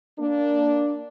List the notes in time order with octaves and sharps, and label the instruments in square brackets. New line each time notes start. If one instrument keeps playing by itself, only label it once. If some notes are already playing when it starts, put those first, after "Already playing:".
[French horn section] A#3 D4